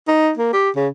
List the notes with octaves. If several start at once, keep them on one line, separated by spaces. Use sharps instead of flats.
D#4
A#3
G4
C#3